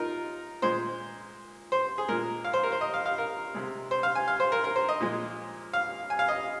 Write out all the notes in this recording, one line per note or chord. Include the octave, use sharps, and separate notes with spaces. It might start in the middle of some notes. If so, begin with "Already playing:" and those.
Already playing: D#4 F4 A#4
A#2 G#3 C5
C5
G#4
A#2 G#3 A#4
F5
C5
A#4
C5
D#5
F5
F5
A#4
C3 G#3
C5
F5
G#5
F5
C5
A#4
A#4
C5
D#5
A#2 F3 G#3
F5
G#5
F5
D#5